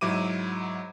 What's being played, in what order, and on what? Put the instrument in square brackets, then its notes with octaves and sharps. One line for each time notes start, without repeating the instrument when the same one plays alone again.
[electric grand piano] G#2 F#3 E4 D6 D#7